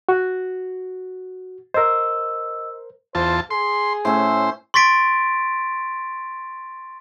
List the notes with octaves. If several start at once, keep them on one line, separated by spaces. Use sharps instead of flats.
F#4
A#4 C5 D#5 E6
E2 F4 C5 A5
G#4 C6
A2 C#4 C5 E5
C6 C#6 A6 B6 D7